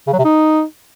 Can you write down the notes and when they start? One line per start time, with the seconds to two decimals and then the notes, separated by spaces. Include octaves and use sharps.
0.07 C#3
0.13 F#3
0.19 C3
0.24 D#4